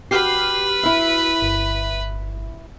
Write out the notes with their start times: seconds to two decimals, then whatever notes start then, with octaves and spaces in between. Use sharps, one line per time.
0.11 F#4 G4 B4 F6 C7
0.83 E4 E5
1.42 G1